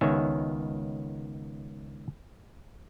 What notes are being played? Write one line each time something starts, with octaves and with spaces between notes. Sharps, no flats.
C#2 D#3 B3 C#5 E5 G#5